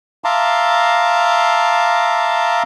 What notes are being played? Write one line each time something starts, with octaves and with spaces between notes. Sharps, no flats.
E5 F5 A5 A#5 C6 D6